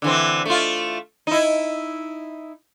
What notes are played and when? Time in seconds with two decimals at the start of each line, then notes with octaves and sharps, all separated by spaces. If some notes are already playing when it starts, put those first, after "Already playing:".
0.02 D3 E3 C4
0.46 A3 F4
1.27 D#4 E4